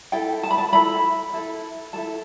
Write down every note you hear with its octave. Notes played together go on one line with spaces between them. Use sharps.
E4 A4 G5
A5
B5
A5
E4 A4 B5
E4 A4
E4 A4 A5